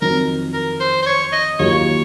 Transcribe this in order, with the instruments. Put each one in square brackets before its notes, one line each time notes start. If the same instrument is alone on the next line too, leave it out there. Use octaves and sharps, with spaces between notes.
[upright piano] F2 D#3 F#3 C4 [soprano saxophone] A#4
[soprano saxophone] A#4
C5
C5
C#5
D#5
[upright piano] D#2 D#3 F#3 A#3 F4 [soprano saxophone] C#5